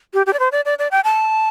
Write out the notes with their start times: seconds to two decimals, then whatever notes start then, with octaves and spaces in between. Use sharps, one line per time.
0.14 G4
0.26 G4
0.33 D5
0.39 C5
0.52 D5
0.65 D5
0.79 D5
0.91 G5
1.04 A5